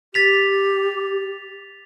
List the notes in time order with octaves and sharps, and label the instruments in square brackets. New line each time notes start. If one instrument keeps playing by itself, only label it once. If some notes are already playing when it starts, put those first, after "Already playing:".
[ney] G4 [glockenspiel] A6 B6 F7